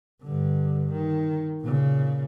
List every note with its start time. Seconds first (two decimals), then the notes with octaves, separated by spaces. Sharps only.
0.22 G2 D3
0.92 D#3
1.61 A#2 C#3